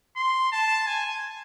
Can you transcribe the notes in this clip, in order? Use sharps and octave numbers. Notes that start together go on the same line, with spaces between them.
C6
A5
G#5